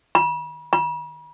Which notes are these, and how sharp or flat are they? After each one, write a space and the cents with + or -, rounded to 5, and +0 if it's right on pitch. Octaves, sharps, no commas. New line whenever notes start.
B5 -40
B5 -45